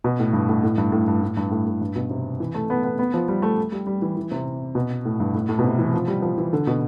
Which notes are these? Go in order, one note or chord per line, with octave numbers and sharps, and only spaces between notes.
B2
A2
G2
A2
A2
G2
A2
G2
A2
G2
A2
A2
G2
B2
C3
E3
A3
B3
B3
B3
F3
G3
A3
G3
G3
E3
E3
C3
B2
A2
G2
A2
A2
B2
C3
E3
F3
G3
F3
E3
D3
B2